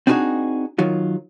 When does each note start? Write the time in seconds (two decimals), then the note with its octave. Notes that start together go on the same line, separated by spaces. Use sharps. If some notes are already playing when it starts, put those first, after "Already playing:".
0.07 C4 D4 D#4 F4 F#4 G#4
0.78 D#3 F#3 F4